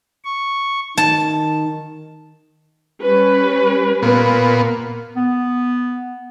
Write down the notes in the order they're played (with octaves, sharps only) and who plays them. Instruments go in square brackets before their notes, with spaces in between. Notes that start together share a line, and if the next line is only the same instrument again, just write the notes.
[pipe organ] C#6
[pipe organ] D#3 [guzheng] A5
[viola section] G3 C#4 B4
[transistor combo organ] A#2 B3
[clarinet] B3